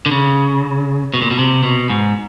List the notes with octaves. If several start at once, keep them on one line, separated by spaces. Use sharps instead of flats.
D3
C#3
B2
A#2
B2
C3
B2
G#2